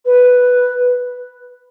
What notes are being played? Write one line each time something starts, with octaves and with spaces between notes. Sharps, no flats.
B4